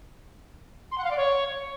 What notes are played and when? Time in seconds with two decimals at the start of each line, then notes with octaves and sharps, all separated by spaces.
0.91 C6
0.98 F#5
1.04 F5
1.11 D5
1.17 C#5